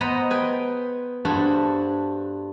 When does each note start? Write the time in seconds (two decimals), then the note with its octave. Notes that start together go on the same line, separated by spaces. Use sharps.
0.01 B3 B4 C5 D#5 A#5
0.30 G#4 B4 G5
1.25 G2 D4 F#4 G#4 A4 C5